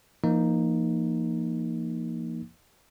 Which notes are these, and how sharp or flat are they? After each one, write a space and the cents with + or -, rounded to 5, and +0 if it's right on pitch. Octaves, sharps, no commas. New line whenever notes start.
F3 -40 A#3 +0 D#4 +0